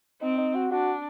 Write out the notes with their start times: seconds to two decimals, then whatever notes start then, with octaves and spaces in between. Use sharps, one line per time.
0.22 C4 D#4
0.38 D#4
0.55 F#4
0.71 D4 F#4